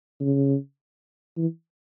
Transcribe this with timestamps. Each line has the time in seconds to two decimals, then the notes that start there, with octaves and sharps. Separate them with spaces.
0.20 C#3
1.37 E3